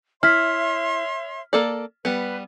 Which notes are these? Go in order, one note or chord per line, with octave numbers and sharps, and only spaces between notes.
E4 C#5 E5 C6 F6 B6
A#3 A4 D5
G3 B3 B4